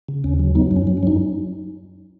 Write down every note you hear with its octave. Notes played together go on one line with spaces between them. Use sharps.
C#3
D#2 C#4
F#3
F#3 B3 D#4
F#2
C#4
F#3
C#4
F#3 D#4